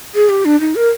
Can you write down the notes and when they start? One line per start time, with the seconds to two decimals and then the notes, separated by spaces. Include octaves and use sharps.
0.15 G#4
0.29 G4
0.45 D4
0.61 D#4
0.76 A#4